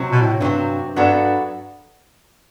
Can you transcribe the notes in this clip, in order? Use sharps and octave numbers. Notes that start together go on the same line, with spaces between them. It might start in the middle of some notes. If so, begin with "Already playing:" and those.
Already playing: C3 F#3 C4
B2
A2
G2 C3 F#3 C4
G2 F#3 B3 D4 F#4 A4